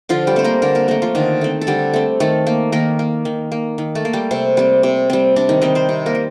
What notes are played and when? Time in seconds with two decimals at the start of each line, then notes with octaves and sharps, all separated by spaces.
0.09 D3 F3 F4
0.27 G3 G4
0.36 A3 C4 C5
0.44 A#3 A#4
0.62 D3 A#3 A#4
0.75 A#3 A#4
0.88 A3 A#3 C4 A#4
1.02 F3 F4
1.15 D3 D#3 D#4
1.41 A3 C4
1.61 A4
1.67 D3 G3 G4
1.94 A3 C4
2.20 D#3 A3 A4
2.47 A#3
2.72 D#3 A#3 A#4
2.99 A#3
3.25 D#3
3.52 A#3
3.78 D#3
3.95 A3 A4
4.05 A#3
4.13 G3 G4
4.31 C3 C4
4.57 G3 C4
4.83 C3
5.10 G3 C4
5.36 C3 D4
5.49 D#3 D#4
5.62 D#3 G3 C4 D#4
5.75 C4 C5
5.89 C3
6.06 A#3 A#4
6.15 G3